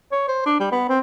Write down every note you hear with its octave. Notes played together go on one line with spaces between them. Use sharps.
C#5
C5
D4
G3
B3
C4